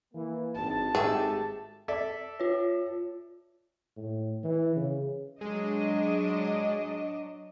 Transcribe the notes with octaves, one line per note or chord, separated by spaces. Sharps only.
E3 A#3
G#1 G2 A5
G#1 G#2 G#3 A3 G4 G#4 E5
A4 D5 E5
F4 C#5
A2
E3
C#3
F#3 G#3 D4 D#5